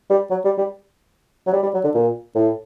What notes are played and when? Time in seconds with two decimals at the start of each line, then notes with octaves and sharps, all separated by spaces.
0.10 G3
0.31 F#3
0.45 G3
0.58 G3
1.47 F#3
1.53 G3
1.63 G3
1.74 F#3
1.84 D3
1.95 A#2
2.35 A2